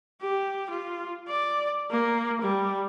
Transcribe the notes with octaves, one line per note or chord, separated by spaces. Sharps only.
G4
F4
D5
A#3
G3